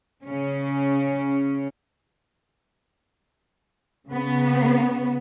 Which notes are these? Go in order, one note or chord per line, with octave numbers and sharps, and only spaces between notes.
C#3 C#4
C#3 B3